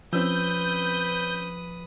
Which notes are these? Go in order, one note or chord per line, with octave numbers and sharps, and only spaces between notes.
F3 C4 C#4 B4 D#6 E6 G6